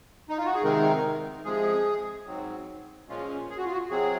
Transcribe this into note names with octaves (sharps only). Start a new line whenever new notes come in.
D#4
F4
F#4
G#4
C3 D#3 G#3 C4 D#4 A#4
C3 F3 G#3 G#4
G#2 F#3 C4
A#2 F3 G#3 C#4 F4
G#4
F#4
F4
F#4
C3 F#3 C4 G#4